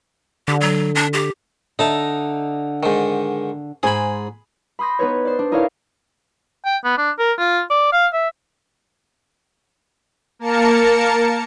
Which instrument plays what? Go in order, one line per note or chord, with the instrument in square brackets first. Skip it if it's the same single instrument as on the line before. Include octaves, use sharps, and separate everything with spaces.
[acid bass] D3 [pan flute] G4
[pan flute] F#3
D4
G4
[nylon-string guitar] D3 E5 [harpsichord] D#4 A5 A#5
[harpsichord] G#2 D#3
[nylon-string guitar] G#2 C5 G#5 [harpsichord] G#4 B5
[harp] B5 C6 D#6 G6 A#6
B3 D#4 B4 C#5
C5 D5
D4
D#4 E4 A#4 C#5 D5 F5
[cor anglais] G5
B3
D4
A#4
F4
D5
F5
E5
[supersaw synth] A#3 A#4 A5 C#7